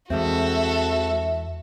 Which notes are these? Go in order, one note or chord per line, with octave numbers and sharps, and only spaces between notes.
E2 E3 G#3 C4 F#4 A4 E5